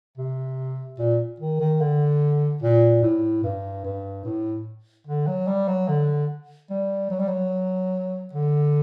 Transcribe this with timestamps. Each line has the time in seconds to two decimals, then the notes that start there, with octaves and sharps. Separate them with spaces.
0.17 C3
0.99 A#2
1.40 D#3
1.60 D#3
1.81 D3
2.62 A#2
3.03 A2
3.44 G2
3.85 G2
4.25 A2
5.07 D3
5.27 F#3
5.47 G3
5.68 F#3
5.89 D3
6.70 G3
7.11 F#3
7.20 G3
7.28 F#3
8.33 D3